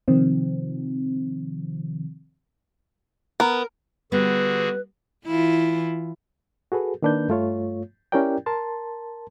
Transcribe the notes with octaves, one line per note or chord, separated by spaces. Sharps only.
C3 D#3 F3 C4
B3 A#4
D3 G3 B3 F#4 G#4 B4
E3 E4 F4
F#4 G#4 A4 B4
D#3 A#3 D4 B4 G6
G2 A3 F4 C#5
C#4 E4 G4 A#4 D5 G5
A#4 A5 C6